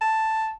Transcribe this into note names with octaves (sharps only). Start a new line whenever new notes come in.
A5